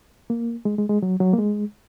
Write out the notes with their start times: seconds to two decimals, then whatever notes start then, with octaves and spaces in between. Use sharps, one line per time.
0.30 A#3
0.65 G#3
0.78 G#3
0.89 G#3
1.02 F#3
1.20 F#3
1.33 A#3
1.38 G#3